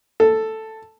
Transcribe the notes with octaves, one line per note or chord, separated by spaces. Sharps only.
A4